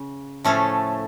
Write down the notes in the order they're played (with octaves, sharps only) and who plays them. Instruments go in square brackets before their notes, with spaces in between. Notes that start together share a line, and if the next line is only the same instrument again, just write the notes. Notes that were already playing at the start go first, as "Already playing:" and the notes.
Already playing: [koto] C#3
A2 F3 A3 C#4 A4